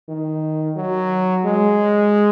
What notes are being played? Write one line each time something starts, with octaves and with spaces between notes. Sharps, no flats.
D#3
F#3
G#3